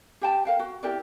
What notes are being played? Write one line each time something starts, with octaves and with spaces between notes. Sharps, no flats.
G4 G5 A5
A#4 F5 G5
F#4
E4 G4 A#4 D5